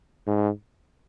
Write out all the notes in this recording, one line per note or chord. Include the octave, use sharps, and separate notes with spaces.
G#2